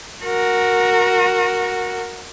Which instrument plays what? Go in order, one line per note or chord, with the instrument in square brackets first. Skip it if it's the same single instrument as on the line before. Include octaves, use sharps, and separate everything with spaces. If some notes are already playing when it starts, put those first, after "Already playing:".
[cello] F#4 A#4